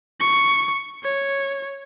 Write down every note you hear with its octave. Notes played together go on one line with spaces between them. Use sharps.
C#6
C#5